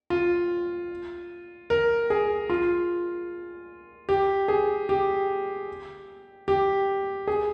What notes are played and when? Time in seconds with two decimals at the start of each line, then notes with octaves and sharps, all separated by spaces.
0.10 F4
1.70 A#4
2.10 G#4
2.50 F4
4.09 G4
4.48 G#4
4.89 G4
6.48 G4
7.27 G#4